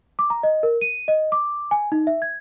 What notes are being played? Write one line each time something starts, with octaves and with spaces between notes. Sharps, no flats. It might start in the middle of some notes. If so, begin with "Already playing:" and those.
D6
A#5
D#5
A#4
D#7
D#5
D6
G#5
D#4
E5
G#6